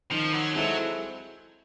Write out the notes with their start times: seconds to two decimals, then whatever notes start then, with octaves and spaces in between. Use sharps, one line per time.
0.12 D#3 F3
0.33 F#3
0.55 F#3 G#3 C4 E4 A4